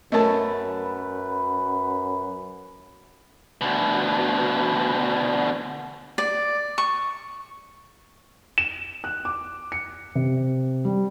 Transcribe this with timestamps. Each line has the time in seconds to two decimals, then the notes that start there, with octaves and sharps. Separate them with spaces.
0.12 F#2 A3 C#4 A#4 B4 D#5 A5
3.61 D2 B2
6.18 D5
6.78 C#6
8.58 E7
9.04 F#6
9.25 D6
9.72 C#7
10.15 C3
10.85 G3